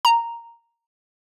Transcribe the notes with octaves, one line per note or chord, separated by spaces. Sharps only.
A#5